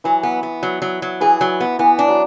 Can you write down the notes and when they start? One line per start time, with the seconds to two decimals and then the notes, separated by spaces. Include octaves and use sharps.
0.04 E3 F#3
0.23 B3
0.43 B3
0.63 F#3
0.82 F#3
1.02 F#3
1.21 E3 G#4
1.41 F#3
1.60 B3
1.79 E3 B3
1.99 D4
2.08 F#3